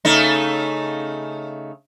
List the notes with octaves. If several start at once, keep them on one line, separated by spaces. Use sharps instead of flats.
C#3 A3 D#4